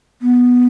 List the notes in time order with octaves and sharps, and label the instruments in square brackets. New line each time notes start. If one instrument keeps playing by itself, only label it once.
[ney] B3